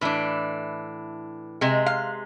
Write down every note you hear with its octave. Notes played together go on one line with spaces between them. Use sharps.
A2 E3 D4
C3 G#3
F5